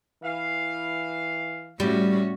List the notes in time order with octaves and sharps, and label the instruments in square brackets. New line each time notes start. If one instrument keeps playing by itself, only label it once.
[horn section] E3 F5
[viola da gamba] A2 C#4 F#4 [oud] G3